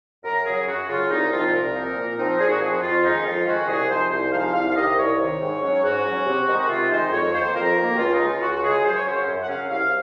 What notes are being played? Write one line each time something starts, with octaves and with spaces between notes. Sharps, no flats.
F#2 A#4
C#3 F#3 G#4
F#2 F#4
C#3 F#3 F4
C2 D#4
A#2 F3 C4 D#4 F4
C2 A#4
A#2 F3 C4 D#4
A#2
F3 C4 D#4
A#2 G#4
F#4
F3 C4 D#4 G#4
F#4
F2 F4
D#3 G#3 C#4 D#4
F2 F4
D#3 G#3 C#4 F#4
C2 G#4
C3 F3 G#3 D#4 C5
C2 C5
C3 F3 G#3 D#4 F5
C2 F5
F5
C3 D#3 D#5
C2 C#5
C3 D#3
G#2
F#3 C#4
G#2 F#4
F#3 C#4
C3
D#3 G#3 D#4
C3 F4
D#3 G#3 D#4 C5
F2 C#5
D#3 A#3 C5
F2 A#4
D#3 A#3
F#4
C#2 F4
D#4
C#3 G#3
F4
C#2 F#4
F#4
C#3 G#3 G#4
F#2 C5
C#5
C#3 F#3 C#4 C5
F#2
F#5
C#3 F#3 C#4 F5
C2 F5